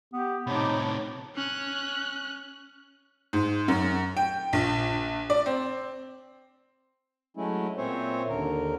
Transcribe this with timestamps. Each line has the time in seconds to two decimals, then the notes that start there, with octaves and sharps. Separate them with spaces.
0.13 B3 G4
0.47 A2 C3 D#4 C#5 A5 B5 D6
1.35 C#4 F#6
3.33 G#2
3.68 F#2
4.17 G5
4.53 A#1
5.30 D5
5.46 C4
7.37 F#3 G#3 A3 C#4 E4
7.78 A#2 C4 C#4 C5 C#5 E5
8.28 D#2 D3 A#4